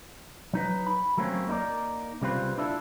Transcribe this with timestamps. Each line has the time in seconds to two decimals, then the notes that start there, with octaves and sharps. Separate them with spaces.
0.53 F#3 D#4 B4
0.87 B5
1.17 F#3 A3 A#3 C4 C#4
1.48 A#3 D#4 E4 A#4 D5
2.21 C2 C#3 G3 C4 F4 B4
2.58 D4 E4 F4 G4 A4